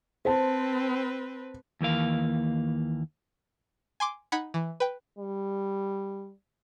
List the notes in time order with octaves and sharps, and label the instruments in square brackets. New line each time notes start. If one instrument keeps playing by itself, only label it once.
[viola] C4 B4 [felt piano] C5 A5
[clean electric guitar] D#2 E3 A#3 F5
[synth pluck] G#5 C6 D6
D#4 F#5 B5 G#6 C#7
E3
B4 G5
[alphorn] G3